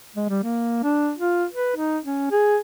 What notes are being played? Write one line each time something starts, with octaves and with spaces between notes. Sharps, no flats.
G#3
G3
A#3
D4
F4
B4
D#4
C#4
G#4